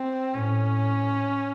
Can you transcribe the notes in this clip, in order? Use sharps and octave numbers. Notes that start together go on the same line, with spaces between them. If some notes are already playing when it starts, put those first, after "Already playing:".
Already playing: C4
A2 C#4